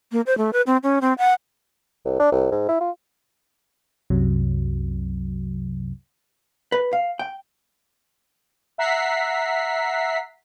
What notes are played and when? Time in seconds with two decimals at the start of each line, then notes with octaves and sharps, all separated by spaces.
0.12 A#3
0.27 C5
0.38 A3
0.53 B4
0.67 C4
0.83 C#4
1.01 C4
1.18 F#5
2.05 C2
2.20 D4
2.32 C2
2.52 G#2
2.69 E4
2.81 F4
4.10 C2 F#2 C3 F#3
6.72 B4
6.93 F5
7.19 G5
8.78 E5 F#5 A#5 B6 C7